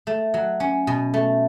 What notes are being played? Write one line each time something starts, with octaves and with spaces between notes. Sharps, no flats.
A3
F#3
C#4
B2
A3